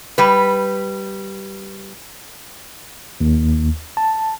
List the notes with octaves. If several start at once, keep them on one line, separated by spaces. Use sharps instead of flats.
G3 B4
D#2
A5